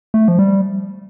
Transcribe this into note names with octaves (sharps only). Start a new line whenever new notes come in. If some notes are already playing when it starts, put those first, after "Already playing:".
A3
F3
G3